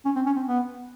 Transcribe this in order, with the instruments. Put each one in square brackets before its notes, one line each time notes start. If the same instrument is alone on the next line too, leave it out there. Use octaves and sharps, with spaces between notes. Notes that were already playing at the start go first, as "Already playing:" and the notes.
[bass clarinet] C#4
C4
C#4
C4
B3